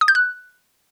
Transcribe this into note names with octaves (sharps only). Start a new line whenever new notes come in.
D#6
G6
F#6